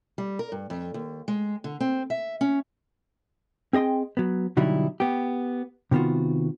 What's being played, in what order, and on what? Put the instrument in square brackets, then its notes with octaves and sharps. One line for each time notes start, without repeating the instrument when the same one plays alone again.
[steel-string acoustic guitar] G3
A#4
G2
F2
D#2
G#3
D3
C4
E5
C#4
[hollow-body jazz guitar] C4 G#4 D#5 G5 C6
F#3 B3
B2 D3 F#3 G3 D#4 E4
B3 G4
C3 D#3 B3 F4 F#4